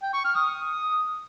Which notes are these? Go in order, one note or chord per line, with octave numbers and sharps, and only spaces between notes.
G5
C#6
F6
D#6